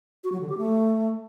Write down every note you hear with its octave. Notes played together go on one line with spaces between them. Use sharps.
F#4
F#3
D3
G4
A3